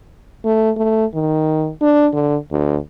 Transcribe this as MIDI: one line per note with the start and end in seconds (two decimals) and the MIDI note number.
0.45 0.71 57
0.77 1.05 57
1.14 1.70 51
1.81 2.08 62
2.14 2.36 50
2.51 2.76 38